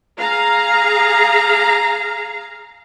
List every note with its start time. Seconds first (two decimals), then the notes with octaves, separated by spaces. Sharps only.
0.18 G#4 F5 A#5